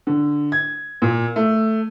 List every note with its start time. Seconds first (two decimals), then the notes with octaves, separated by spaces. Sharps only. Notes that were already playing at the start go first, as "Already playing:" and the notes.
0.07 D3
0.52 G#6
1.02 A#2
1.36 A3